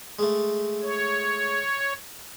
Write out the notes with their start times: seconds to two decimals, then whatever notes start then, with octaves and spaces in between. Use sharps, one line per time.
0.19 G#3 A3
0.82 C#5